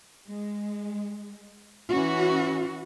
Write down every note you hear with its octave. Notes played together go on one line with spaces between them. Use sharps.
G#3
E3 C#4 F#4